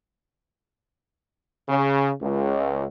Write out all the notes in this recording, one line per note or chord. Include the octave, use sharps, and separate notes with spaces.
C#3
C#2